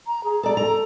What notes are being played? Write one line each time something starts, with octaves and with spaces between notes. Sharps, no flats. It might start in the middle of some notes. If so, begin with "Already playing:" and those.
A#5
G#4
A4 D5 A#5
A4 A#5